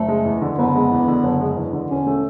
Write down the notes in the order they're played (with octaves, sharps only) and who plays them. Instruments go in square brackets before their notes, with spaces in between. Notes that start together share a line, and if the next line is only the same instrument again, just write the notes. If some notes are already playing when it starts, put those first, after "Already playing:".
Already playing: [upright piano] F#1 [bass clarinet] A3
[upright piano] G#3
E2
D3
[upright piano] F#1 [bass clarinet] B3
[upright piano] G#3
E2
D3
F#1
G#3
E2
D3
[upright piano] E1 [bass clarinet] C#4
[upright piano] A3